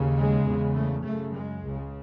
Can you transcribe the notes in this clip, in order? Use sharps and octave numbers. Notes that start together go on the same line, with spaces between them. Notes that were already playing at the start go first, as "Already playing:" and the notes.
Already playing: D#2 C#3
G#3
E2 C#3
A3
F#2 C#3 A3
G#3
C#2 C#3